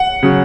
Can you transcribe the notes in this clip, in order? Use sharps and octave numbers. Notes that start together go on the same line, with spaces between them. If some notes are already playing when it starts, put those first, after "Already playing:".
Already playing: F#5
C#3 F#3